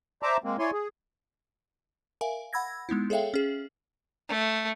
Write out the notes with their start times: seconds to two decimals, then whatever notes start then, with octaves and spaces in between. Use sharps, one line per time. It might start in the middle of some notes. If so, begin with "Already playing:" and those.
0.23 C5 D5 E5 A5 A#5 D6
0.44 G#3 A#3 C4
0.59 E4 C#5 D5 G#5 C6
0.72 G#4
2.21 A#4 E5 F5 G#5
2.53 F#5 B5 E6 G#6 A#6
2.89 G#3 B3 D#4 E4
3.10 G#4 A4 C#5 E5 F5 G5
3.34 C#4 G#4
4.29 A3